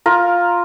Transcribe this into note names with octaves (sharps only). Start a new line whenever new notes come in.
F4 A#4